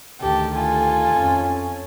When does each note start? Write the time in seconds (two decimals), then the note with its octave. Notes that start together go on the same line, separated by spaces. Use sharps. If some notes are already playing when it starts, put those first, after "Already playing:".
0.21 D2 D#3 G4 A4 A5
0.56 F4 A4 G#5
1.15 F2 C#4